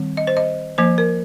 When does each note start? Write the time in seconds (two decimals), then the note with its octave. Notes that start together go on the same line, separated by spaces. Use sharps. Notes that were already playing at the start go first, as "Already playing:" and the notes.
Already playing: D#3 G3 C4
0.17 D#5
0.27 C5
0.37 D#5
0.78 F3 A#3 C5
0.98 A#4